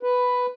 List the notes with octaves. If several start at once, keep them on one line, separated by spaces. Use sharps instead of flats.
B4